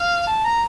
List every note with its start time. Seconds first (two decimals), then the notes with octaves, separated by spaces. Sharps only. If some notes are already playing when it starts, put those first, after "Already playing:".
Already playing: F5
0.27 A5
0.44 A#5